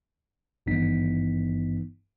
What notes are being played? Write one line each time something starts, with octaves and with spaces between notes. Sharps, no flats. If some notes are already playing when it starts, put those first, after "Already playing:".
G#1 G2 E3 B3 D#4 B6